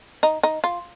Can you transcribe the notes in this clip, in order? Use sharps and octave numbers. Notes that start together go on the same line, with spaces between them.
D#4
D#4
F4